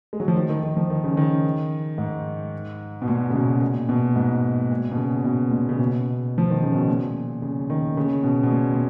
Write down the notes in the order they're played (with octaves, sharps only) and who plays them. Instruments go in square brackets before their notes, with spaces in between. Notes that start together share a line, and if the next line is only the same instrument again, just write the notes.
[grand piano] G#3
F#3
F3
D#3
D#3
D#3
F3
D#3
C#3
D#3
G#2
B2
A#2
C#3
B2
A#2
B2
G#2
A#2
B2
C#3
B2
A#2
C#3
B2
F3
D#3
C#3
B2
A#2
C#3
D#3
C#3
B2
B2
A#2
A#2